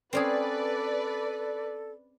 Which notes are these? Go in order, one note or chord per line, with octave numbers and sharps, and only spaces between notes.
C4 C#4 G#4 A4 B4 D5